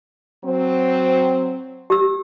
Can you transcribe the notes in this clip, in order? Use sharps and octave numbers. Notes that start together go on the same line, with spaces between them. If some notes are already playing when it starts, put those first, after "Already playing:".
F#3 C4
G4 E6